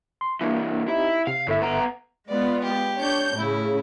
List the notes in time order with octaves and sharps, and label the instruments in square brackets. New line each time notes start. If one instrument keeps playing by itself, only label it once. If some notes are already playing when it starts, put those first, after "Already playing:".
[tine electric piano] C6
[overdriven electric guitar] C2 E3 [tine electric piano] A#3 D4
[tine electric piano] C4 D#4 G4 [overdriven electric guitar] E4
[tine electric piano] C3 [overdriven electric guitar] F5
[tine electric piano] G1 A4 E5 [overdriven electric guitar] A2
[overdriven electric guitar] B3 A#5
[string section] G#3 B3 F4 [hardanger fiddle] D5
[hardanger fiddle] G4
[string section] D4 C#5 G6
[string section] A2 C#3 [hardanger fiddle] E4